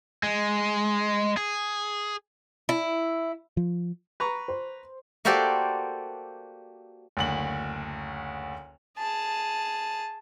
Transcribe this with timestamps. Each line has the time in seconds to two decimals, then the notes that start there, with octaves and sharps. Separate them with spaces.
0.23 G#3
1.37 G#4
2.69 E4
3.57 F3
4.20 B4 A#5 C#6
4.48 C5 C6
5.25 A#3 F#4 G4 A4 C5 D5
7.17 F#1 D2 F#7
8.98 G#4 A5